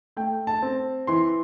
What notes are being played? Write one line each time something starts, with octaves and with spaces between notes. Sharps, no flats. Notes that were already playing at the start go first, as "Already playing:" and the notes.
A3 G5
A5
C4
E3 C6